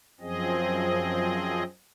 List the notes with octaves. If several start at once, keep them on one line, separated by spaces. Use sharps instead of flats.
F#2 F3 C4 G#4 D#5